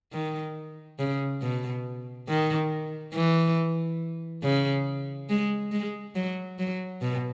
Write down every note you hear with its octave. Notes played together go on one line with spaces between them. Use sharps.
D#3
C#3
B2
D#3
E3
C#3
G#3
G#3
F#3
F#3
B2